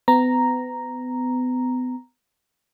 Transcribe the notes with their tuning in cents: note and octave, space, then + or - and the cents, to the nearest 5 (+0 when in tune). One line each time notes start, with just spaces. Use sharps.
B3 +35 A#5 +0